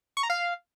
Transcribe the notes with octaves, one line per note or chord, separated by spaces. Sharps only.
C#6
A#5
F5